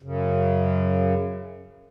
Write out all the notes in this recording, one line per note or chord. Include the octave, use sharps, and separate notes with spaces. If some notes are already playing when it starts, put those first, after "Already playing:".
F#2 C#3